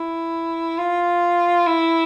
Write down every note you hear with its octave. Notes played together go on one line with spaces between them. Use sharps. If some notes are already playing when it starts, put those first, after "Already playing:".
Already playing: E4
F4
E4